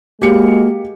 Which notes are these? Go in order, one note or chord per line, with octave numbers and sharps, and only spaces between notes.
G#3 A#3 F#4 G4 C#7